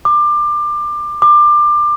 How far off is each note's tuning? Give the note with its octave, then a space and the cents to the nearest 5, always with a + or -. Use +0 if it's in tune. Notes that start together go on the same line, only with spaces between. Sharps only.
D6 +25
D6 +25